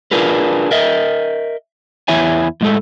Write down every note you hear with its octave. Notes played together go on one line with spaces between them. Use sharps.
D4 F4 G#4 A#4 B4
A#4 D#5 E5
E2 E4 C#5 E5 G#5
A2 G#3 A4